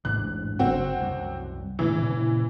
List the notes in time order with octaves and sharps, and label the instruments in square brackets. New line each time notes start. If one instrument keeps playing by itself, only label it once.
[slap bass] A1 G#2 D4 [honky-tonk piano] F#6
[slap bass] F#1 [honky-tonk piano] C4 F#4
[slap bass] C2 F#2
[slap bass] A2 D#3 C4 [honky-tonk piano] E3
[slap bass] A#2 C#3